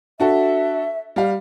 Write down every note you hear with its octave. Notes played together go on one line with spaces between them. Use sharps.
D4 F#4 A4 E5
G3 F5